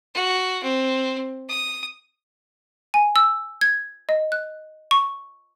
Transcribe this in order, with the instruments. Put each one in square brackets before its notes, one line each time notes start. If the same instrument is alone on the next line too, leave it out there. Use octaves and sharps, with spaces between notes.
[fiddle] F#4
C4
D#6
[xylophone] G#5
E6
G#6
D#5
F#6
C#6